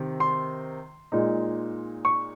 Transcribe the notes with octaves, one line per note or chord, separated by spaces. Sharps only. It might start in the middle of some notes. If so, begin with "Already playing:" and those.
Already playing: C3 D#3
C6
A#2 G#3 D#4
C#6